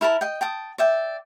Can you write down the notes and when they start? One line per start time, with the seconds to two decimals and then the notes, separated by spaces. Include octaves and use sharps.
0.01 E4 A#4 A5 B5
0.21 D#5 G5
0.41 G5 A5 D#6
0.78 D5 E5 G5